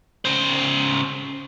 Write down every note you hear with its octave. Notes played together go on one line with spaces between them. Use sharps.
C#3 C5